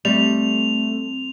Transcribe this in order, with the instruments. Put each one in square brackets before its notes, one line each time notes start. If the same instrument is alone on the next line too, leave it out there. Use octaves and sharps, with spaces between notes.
[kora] G3 [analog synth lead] A3 [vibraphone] C4 [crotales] F7